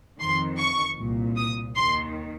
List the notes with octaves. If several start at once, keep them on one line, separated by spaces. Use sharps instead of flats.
F2 D#3 C6
C#6
C2 A#2
D#6
D#2 D#3 C6